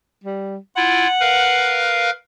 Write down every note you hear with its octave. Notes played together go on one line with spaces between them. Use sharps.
G3
E4 F4 F#5
A#4 B4 F5